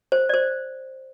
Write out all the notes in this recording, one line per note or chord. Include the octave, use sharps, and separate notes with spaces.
C5
D5
C5